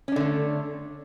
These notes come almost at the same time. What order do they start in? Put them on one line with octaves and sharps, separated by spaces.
C#4 D4 D3 A3